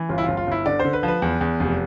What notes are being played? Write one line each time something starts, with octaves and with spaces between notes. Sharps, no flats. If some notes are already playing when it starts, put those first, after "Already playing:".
Already playing: E3
G1 F4
E4
G1 F4
F4
G1 E4
D3 D5
C5
D3
B4
F3
B4
E2
E2
F1